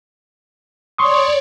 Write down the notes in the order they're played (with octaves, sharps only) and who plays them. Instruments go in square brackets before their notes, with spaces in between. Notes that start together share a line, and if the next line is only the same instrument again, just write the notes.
[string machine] C#5 D5 [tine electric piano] C6 C#6 D#6